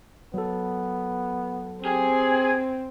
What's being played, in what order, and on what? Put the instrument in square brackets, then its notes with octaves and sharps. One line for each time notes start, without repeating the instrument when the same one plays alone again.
[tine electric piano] F#3 A4 [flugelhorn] B3
[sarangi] C4 [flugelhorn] G4 [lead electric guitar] G#4